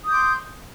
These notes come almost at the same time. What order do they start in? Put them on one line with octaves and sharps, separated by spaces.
D#6 G6 D6 C6